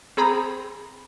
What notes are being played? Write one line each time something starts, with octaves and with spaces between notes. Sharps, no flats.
C4 G#4 A#5 B5